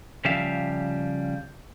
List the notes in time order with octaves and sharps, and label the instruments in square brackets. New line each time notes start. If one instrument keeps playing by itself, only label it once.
[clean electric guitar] C#3 F3 G3 G4 E5 F5